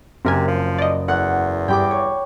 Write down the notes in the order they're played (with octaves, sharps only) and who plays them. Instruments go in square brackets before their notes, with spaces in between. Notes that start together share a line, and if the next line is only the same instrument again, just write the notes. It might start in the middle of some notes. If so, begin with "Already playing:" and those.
[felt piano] F#1 [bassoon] C3 [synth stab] C4 A#4 G#5
[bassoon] F3
[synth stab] D5 D#5
[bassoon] E2 [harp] F#5 F#6 C#7
[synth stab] G2 G3 [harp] G5 B5 D6
[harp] C#5